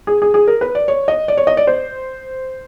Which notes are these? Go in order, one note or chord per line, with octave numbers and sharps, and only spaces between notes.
G#4
G#4
G#4
A#4
B4
D5
C#5
D#5
D5
C#5
D#5
D5
C5